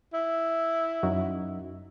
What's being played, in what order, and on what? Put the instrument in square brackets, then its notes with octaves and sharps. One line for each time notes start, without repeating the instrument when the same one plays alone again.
[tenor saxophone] E4
[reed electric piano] F#2 D#4 F#4